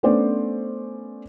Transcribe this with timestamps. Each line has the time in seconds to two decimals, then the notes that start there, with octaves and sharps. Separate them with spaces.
0.03 A3 B3 C#4 D4 C5 D5